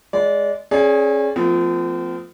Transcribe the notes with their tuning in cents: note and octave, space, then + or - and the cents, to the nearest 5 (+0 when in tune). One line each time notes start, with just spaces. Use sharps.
G#3 +0 D5 -25
C#4 -30 G#4 +20 D5 -30
F3 +0 A3 +30 C4 -40